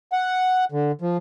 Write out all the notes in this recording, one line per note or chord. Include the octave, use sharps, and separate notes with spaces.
F#5
D3
F3